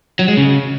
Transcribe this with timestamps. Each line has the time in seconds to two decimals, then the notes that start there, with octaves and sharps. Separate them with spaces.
0.19 F#3
0.28 G#3
0.37 C#3